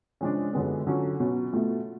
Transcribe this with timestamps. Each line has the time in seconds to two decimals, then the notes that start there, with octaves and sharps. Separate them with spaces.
0.21 C#3 F3 G#3 D4
0.53 F#2 D3 G#3 B3
0.87 D3 F#3 C#4 F4
1.20 B2 F#3 C#4
1.53 B2 A3 F4